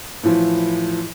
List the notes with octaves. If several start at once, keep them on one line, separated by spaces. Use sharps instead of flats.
A2 E3 F3